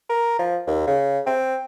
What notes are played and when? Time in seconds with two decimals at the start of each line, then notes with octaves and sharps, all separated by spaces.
0.10 A#4
0.39 F3
0.67 D#2
0.87 C#3
1.27 C4